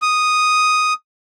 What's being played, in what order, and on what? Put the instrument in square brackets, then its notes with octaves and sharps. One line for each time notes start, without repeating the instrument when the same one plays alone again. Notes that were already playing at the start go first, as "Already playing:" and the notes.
[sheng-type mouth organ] D#6